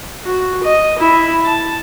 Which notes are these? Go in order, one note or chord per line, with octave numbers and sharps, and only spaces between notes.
F#4
D#5
E4
A5